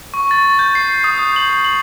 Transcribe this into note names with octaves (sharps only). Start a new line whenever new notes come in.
C#6
A6
G6
C7
D#6
G6
F#7
F#7